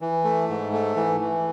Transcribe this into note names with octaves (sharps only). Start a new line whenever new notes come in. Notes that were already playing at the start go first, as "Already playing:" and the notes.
E3
A3
G#2
A3
E3
E3